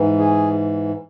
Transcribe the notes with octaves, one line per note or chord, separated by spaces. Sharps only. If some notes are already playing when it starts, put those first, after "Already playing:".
Already playing: G#2 E3
G#4